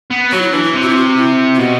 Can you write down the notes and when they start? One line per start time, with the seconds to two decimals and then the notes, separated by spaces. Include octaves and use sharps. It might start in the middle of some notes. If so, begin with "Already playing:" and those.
0.10 B3
0.32 F#3 F#4
0.42 E4
0.52 E3 D4
0.63 E4
0.75 C3
0.82 F#4
0.89 E4
0.96 F#4
1.17 E4
1.55 E4
1.59 B2 F#4